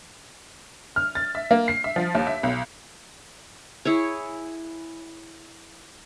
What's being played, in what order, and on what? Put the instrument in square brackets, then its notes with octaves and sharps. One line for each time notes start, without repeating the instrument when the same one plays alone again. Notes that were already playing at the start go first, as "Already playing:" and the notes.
[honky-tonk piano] F6
A6
E5
A#3
C7
E5
F3
D#2
E5
B1
[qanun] E4 G#4 C#5